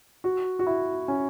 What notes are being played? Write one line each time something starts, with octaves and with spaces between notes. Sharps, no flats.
F#4
F#4
E4
C#4